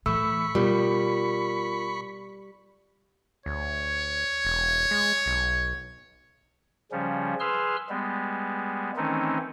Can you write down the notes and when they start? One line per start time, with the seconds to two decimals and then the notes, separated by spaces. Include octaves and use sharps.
0.06 A2 E3 A3 B5 C#6 E6
0.55 B2 G3 F4 A#4
3.46 D2 C#5
4.45 E1
4.91 G#3
5.26 B1
6.92 C#3 F3 G3 C#4
7.40 G#4 B4 C6 E6 F6
7.89 G3 G#3 B3
8.97 D#3 E3 A3 C4 C#4 D#4